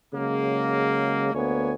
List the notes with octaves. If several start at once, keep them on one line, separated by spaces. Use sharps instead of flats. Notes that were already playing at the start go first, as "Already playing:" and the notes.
C#3 F#3 G#3 A#3
D2 A#3 B3 C#5 G#5